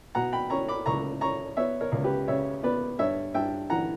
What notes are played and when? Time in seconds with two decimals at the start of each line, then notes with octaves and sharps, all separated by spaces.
0.15 B2 F#5 A#5
0.33 G5 B5
0.50 C#4 A#5 C#6
0.68 B5 D6
0.86 C#2 A#5 C#6
1.21 C#4 A#5 C#6
1.57 B3 C#5 E5
1.81 A#4 C#5
1.92 C#2
2.04 G4 B4
2.28 C#3 C#5 E5
2.63 B3 B4 D5
2.99 G2 C#5 E5
3.34 G2 E5 G5
3.70 E3 F#5 A#5